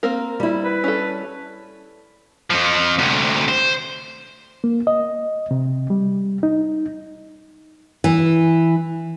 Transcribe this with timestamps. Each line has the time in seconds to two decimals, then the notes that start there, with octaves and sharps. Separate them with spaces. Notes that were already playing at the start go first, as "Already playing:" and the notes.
0.03 A#3 C4 A#4
0.40 G3 E4
0.65 B4
0.84 C#4 A4
2.50 F2 F3
2.98 D2 C3
3.48 C5
4.64 A#3
4.87 D#5
5.51 C3
5.90 G3
6.43 D#4
8.04 E3